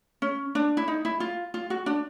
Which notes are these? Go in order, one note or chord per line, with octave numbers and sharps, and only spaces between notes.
C#4
D4
E4
D#4
E4
F4
F4
F#4
D4